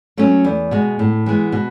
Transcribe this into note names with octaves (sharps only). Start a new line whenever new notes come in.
F#3 A3 C#4
E2
B2 G#3
A2
E3 G#3 B3
B2